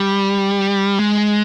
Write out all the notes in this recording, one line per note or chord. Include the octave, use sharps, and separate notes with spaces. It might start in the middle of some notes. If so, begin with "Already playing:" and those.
Already playing: G3
G#3